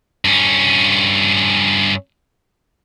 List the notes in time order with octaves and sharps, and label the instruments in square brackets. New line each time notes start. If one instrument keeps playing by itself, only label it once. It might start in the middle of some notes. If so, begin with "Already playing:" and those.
[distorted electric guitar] G2 C#4